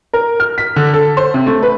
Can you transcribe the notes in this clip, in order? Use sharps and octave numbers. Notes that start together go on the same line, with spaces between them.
A#4
F6
B6
D3
A4
C5
C3
A3
B4